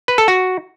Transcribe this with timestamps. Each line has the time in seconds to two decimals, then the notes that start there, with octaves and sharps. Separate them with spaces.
0.08 B4
0.18 A4
0.28 F#4